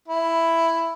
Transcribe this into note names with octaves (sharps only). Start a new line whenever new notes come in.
E4